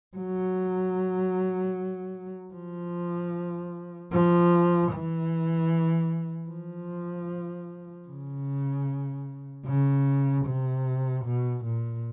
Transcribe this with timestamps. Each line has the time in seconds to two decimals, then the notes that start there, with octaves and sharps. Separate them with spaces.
0.17 F#3
2.54 F3
4.12 F3
4.92 E3
6.50 F3
8.09 C#3
9.66 C#3
10.46 C3
11.25 B2
11.65 A#2